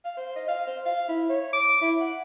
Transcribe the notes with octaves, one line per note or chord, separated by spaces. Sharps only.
F5
C5
D#5
F5
C5
F5
E4
C#5
D6
E4
F#5